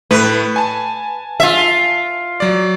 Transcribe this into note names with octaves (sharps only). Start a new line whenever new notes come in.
A2 A3 B4
G#5 A5
F4 E5
F#3 D5